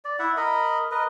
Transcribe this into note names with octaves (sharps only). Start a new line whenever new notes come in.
D5
E4 E5 F#5
A#4 D#5 B5
A#4 B4 D#5